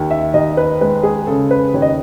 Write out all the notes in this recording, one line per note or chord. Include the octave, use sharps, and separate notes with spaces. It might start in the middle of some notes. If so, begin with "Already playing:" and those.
Already playing: D#2
E5
D#2 D#5
B4
G#3 B4
G#4
C#3 A4
B4
D#2 C#5
D#5